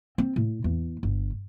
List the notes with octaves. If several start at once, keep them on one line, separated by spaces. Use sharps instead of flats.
C4
A2
E2
G1